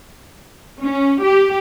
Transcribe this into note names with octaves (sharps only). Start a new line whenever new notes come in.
C#4
G4